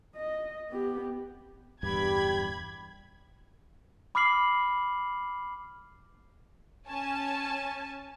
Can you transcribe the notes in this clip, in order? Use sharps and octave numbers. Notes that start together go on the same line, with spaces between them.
D#5
B3 G4
D1 E2 G2 G4 B5 G#6
B5 D6 F6 C7 F#7
C#4 G#5 A5